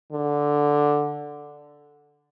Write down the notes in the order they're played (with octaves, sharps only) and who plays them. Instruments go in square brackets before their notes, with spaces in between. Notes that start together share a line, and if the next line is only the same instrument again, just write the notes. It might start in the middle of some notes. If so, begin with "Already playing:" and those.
[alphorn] D3